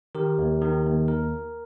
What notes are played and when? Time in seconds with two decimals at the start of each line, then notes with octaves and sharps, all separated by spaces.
0.15 D#3 G4 A#4
0.38 D#2
0.61 D#3
0.86 D#2
1.08 A#4